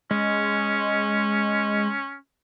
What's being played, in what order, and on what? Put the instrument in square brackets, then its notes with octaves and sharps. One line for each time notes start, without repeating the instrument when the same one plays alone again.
[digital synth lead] G#3 [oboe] C#4